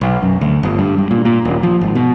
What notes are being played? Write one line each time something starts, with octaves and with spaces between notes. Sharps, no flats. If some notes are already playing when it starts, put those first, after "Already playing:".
B1
F#2
D2
G1
G2
G2
A#2
A#2
D#1
F3
G#1
B2